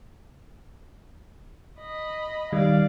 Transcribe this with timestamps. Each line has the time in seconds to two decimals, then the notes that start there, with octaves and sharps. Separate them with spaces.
1.79 D#5 B5
2.53 D#3 G3 D5 F5